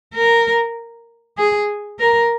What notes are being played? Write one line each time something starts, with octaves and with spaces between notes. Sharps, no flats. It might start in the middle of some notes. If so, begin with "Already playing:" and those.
A#4
G#4
A#4